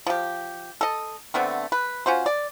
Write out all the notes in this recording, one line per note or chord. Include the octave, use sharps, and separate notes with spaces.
F3 G4
A4 D#5
D3 A3 B3 C4
B4
C#4 F4 F#4 C5
D5